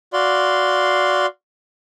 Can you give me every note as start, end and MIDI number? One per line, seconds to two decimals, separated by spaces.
0.13 1.26 66
0.13 1.26 74
0.13 1.26 77
0.13 1.26 84